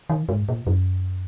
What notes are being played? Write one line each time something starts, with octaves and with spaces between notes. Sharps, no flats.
D#3
G#2
A#2
F#2